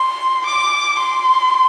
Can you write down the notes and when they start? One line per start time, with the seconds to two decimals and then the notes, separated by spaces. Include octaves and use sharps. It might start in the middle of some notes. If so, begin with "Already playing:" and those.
Already playing: C6
0.46 D6
0.99 C6